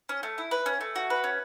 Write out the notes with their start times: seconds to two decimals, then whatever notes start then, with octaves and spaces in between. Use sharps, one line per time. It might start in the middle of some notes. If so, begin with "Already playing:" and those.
0.09 C#4
0.23 A3
0.38 E4
0.51 B4
0.66 C#4
0.81 A3
0.96 F#4
1.10 B4
1.24 C#4